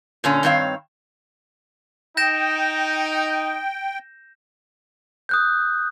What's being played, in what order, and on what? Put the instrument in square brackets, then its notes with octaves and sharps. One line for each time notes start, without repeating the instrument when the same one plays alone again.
[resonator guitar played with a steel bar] A#2 D3 C#4
G2 D#3 C4 C#5 F5
[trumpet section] D#4 [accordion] G5 [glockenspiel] G6 A#6 E7
[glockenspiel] D#6 F#6 G6